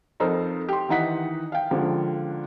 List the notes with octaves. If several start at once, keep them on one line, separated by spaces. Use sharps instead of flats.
F2 D#4 A4 A#4 C5
G4 C6
D#3 E3 D#4 F#5 B6
F5 G5
C#2 D3 F3